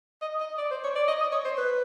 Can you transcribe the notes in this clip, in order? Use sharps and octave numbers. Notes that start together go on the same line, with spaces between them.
D#5
D#5
D5
C5
C#5
D5
D#5
D#5
C#5
C5
B4